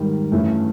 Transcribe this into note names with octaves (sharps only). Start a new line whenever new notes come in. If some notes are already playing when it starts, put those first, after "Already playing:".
Already playing: G#2 D#3 G3
G2 E3 A3 C#4